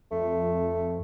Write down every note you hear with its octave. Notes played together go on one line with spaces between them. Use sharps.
F2 A3